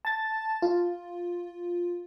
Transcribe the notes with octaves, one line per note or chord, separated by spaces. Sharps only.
A5 A6
F4